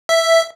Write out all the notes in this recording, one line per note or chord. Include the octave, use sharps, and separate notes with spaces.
E5